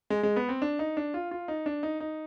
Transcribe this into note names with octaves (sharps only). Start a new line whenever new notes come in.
G#3
G#3
B3
C4
D4
D#4
D4
F4
F4
D#4
D4
D#4
D#4